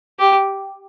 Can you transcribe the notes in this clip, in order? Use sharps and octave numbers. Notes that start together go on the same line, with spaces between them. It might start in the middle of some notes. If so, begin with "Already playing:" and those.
G4